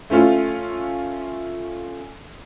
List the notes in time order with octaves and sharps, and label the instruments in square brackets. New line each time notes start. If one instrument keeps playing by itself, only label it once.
[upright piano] A3 C#4 F4